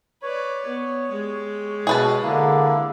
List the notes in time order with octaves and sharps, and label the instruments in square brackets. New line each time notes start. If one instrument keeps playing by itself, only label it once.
[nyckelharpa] B4 D5 [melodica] C#5
[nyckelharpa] B3
G#3 G4
[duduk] B2 [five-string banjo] G#4 B4 A5
[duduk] D3 [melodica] A#3 E4